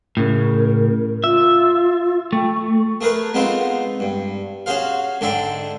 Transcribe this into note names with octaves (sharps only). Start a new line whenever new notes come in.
A2 C#3 A#4
F4 E5
A3 G5
C#6
A3 G#4 A#4 B4
G#3 B3 C4 D#4 F4
G2
C#4 F#4 G#4 C5 F5
G#2 D3 D4 D5 E5 G5